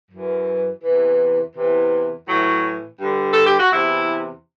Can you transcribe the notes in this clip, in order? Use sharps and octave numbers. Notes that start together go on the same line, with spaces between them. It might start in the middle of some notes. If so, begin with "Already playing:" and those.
F#2 E3
E2 C3 E3
E2 C3 E3
A2 E3 F#3
G2 D3
A4
G4
F#4
E2 C3 E3 E4